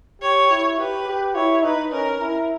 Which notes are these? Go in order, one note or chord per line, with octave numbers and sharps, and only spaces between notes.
G4 C#5
E4
G4 B4
G4
E4 C#5
D#4 B4
C#4 A#4
E4